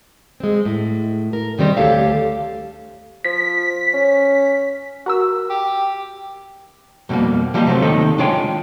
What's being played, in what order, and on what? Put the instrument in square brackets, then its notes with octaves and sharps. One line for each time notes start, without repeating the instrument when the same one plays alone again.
[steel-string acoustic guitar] G#3 C4
A2
A#4
C3 D#3 G3 C4 G4
D2 A3 G4 A4 C#5 F5
[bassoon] F3 [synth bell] B6
[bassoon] C#4
[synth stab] F#4 A#4 E6
[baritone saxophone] G4
[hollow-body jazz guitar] F2 B2 D#3 G3 A#3
F3 G3 A#3 B3 G4 D#5
C3 F#3 G#3 A3 C4
D#2 C3 D#3 A4 D#5
G#3 D4 F4 C#5 G5 G#5